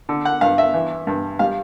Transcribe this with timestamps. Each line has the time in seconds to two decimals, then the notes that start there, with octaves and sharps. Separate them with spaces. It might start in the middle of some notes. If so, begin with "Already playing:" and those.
0.09 D3
0.25 F#5
0.41 G2 F5
0.58 E5
0.74 E3
1.07 G2
1.39 G3 F5